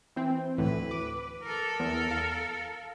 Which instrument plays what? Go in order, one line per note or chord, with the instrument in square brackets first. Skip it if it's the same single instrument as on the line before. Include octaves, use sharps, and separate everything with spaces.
[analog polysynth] E3 C4
[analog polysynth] D2 A2 E3 [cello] B4
[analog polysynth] D6
[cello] A4 A#4
[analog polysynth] E2
F5